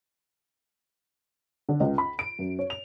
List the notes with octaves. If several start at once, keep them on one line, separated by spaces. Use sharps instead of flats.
D3
C#2
B5
D7
F#2
C#5
F7